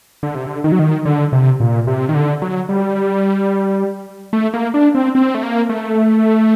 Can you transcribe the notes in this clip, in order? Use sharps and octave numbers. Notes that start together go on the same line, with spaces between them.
D3
C3
D3
D#3
F#3
D#3
D3
C3
A#2
C3
D#3
D3
F#3
G3
A3
A#3
D4
C4
C4
A3
A#3
A3